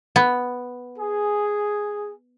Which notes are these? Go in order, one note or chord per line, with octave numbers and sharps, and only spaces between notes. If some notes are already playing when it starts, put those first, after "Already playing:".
B3
G#4